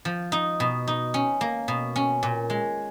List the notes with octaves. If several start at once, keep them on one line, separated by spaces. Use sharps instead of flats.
F3
D#4
B2
D#4
C#4
A#3
B2
C#4
A#2
G#3